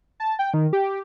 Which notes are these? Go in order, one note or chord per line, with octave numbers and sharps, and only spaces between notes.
A5
G5
D#3
G4